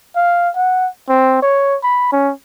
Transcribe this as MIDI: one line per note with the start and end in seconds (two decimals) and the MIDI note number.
0.16 0.50 77
0.56 0.88 78
1.09 1.40 60
1.42 1.77 73
1.83 2.08 83
2.12 2.32 61